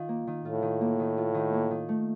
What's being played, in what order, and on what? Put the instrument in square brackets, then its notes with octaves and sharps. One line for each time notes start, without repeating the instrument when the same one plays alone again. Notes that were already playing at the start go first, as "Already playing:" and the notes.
Already playing: [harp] D#3 F4
A#3
D#3
[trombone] A2 [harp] F4
[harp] D#3
A#3
D#3
F4
D#3
A#3
D#3
A3